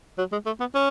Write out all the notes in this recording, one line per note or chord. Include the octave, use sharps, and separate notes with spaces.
F#3
G#3
A3
B3
C#4